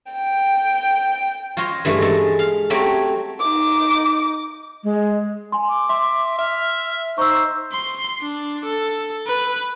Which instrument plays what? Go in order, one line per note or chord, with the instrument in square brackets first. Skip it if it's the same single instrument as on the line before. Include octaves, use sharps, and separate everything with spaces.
[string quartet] G5
[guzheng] F4 C5 C#5 D#5
G2 E3 G#3 A3
G#3 A4
F5
F#3 A3 C4 G4 C#5
[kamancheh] D#4 D6
[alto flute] G#3
[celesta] G#5 C6
[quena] D6
[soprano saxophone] E5 [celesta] C6
[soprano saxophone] E5 [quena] F6
[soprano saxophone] D#4 [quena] C5 [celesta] C#6 E6
[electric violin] C6
D4
A4
B4